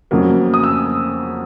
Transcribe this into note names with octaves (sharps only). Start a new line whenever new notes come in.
F2 C#3 F#3 A#3
D#6
E6